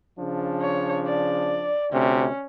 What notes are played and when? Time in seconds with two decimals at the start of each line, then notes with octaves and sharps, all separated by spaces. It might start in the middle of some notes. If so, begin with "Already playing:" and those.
0.19 C#3 F3 D4
0.61 C#5
1.06 D5
1.92 D2 C3 C#4